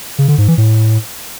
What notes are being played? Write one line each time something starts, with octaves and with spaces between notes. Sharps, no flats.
C#3
D3
G#2
E3
A2